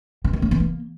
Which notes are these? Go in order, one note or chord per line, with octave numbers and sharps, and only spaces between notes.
E3
D#3
A#3
E3
A#3